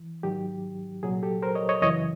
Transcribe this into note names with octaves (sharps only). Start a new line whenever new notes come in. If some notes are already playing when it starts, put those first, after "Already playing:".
Already playing: E3
G#2 D#3 F#3 G4
C2 A#2 F#3 G#4
G4 A4
A#4 C5
C#5 D#5
C#5 D#5
F#2 C#3 E3 C#5 D#5